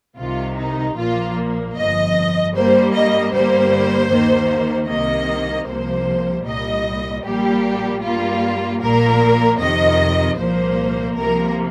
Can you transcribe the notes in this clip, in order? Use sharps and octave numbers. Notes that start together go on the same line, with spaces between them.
C2 C3 D#3 F4
D#4
A#1 A#2 F3 A#3 F4
G1 F2 F3 D#5
G2 G3 A#3 C5
D#5
G1 G2 G3 A#3 C5
D#2 D#3 A#3
C2 C3 D#3 A#3 D#5
C2 C3 F3 A#3 C5
C2 A#2 G3 D#5
A#1 A#2 G3 A#3 G4
G2 G3 A#3 F4
A#1 A#2 A#3 A#4
F2 C3 D#3 D#5
C2 A#2 F3 A#3 C5
C2 C3 F3 A#3 A#4